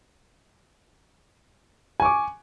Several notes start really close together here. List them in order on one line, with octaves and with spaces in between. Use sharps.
G#5 C#6 D6